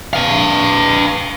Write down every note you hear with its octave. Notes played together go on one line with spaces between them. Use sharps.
B4 F5